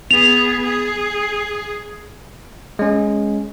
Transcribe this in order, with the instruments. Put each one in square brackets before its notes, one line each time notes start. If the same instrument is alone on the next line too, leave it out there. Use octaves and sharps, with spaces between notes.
[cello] B3 G#4 [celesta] F7
[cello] G#4
[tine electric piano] G#3 C#4